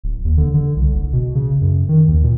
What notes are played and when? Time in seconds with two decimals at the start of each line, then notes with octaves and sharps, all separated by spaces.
0.04 D1
0.25 D#2
0.37 D3
0.54 D3
0.76 C2
0.94 F#1
1.13 B2
1.35 C#3
1.61 F#2
1.89 D#3
2.08 D#2
2.23 A#2